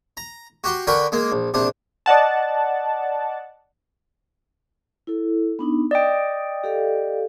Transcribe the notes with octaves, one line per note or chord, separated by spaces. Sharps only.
A#5
F#4 G4 F#5 C6
D3 A#4 B4 G5 C#6
G#3 A#3
A#1
A#1 C3 D4
D5 D#5 F#5 A5
E4 A4
B3 D4 D#4
D5 D#5 G5 D#6
G4 A4 F5